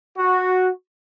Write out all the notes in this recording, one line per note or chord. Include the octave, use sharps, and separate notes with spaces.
F#4